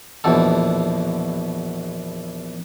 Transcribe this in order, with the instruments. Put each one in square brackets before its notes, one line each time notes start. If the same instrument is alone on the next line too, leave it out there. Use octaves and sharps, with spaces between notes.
[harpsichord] A#1 E2 B2 A4